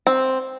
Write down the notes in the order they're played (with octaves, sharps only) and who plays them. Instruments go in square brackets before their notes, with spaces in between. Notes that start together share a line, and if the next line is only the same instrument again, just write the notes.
[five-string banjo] C4